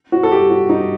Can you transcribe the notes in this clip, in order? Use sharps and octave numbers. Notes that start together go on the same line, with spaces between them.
F#4
A4
G4
F#4
D#4